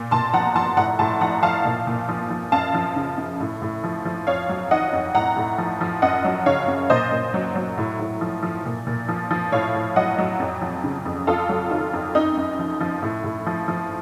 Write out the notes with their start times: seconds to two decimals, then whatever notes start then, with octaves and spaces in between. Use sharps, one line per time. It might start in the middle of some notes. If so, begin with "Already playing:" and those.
Already playing: A#2
0.11 A#2 A5 C6
0.33 F3 F#5 A#5
0.56 F3 A5 C6
0.77 A2 F#5 A#5
0.99 A2 A5 C6
1.21 F3 F#5 A#5
1.43 F3 F5 A5
1.65 A#2
1.87 A#2
2.09 F3
2.30 F3
2.52 F#2 F5 A5
2.74 F3
2.96 C#3
3.18 F#2
3.40 A2
3.62 A2
3.84 F3
4.05 F3
4.27 F2 C#5 F5
4.49 F#3
4.71 D#3 D#5 F#5
4.93 F2
5.15 A2 F#5 A#5
5.37 A2
5.58 F3
5.81 F3
6.02 F#2 D#5 F#5
6.24 F#3
6.46 C#3 C#5 F5
6.68 F#2
6.90 A#2 C5 D#5
7.11 A#2
7.34 F#3
7.55 F#3
7.78 A2
7.99 A2
8.21 F3
8.43 F3
8.65 A#2
8.87 A#2
9.09 F3
9.31 F3
9.52 A2 C#5 F5
9.74 A2
9.96 F#3 D#5 F#5
10.18 F#3
10.40 F2
10.61 F3
10.84 C#3
11.05 F2
11.27 F2 F4 A4
11.49 F#3
11.71 D#3 F4
11.93 F2
12.15 F#2 D#4
12.37 F#2
12.59 F3
12.80 F3
13.03 A2
13.24 A2
13.46 F3
13.68 F3